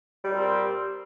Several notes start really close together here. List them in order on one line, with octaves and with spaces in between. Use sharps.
G3 A#2 C4